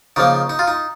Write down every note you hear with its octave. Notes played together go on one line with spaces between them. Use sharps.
C#3 F3 A#3 D#4
D#4
F4
D#4